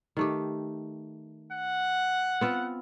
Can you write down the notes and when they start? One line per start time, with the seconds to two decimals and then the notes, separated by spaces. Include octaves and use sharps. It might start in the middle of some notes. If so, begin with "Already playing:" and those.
0.17 D#3 A3 G4
1.52 F#5
2.41 B3 C4 F4